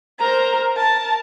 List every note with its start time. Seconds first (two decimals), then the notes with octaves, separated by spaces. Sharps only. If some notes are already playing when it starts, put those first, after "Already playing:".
0.20 A#4 C5 A#5
0.77 A#4 A5